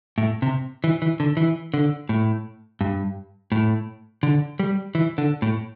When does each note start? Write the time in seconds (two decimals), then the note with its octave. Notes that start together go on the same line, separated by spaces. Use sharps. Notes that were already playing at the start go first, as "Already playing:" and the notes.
0.18 A2
0.42 C3
0.84 E3
1.02 E3
1.20 D3
1.37 E3
1.74 D3
2.09 A2
2.81 G2
3.52 A2
4.23 D3
4.59 G3
4.95 E3
5.18 D3
5.42 A2